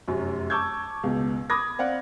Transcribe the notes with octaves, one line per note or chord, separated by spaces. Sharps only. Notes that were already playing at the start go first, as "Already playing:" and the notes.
F1 F#2 F#3
A5 C#6 D6 E6 G6 G#6
C#2 B2
B5 D6 D#6 G#6 A#6
C4 D5 F5 F#5